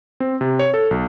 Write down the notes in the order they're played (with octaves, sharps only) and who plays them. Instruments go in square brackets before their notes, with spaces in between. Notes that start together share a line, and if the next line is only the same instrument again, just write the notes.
[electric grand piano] C4
C3
C#5
A4
B1